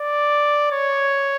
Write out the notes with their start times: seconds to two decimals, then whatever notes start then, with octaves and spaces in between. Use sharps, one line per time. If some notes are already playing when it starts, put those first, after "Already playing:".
Already playing: D5
0.72 C#5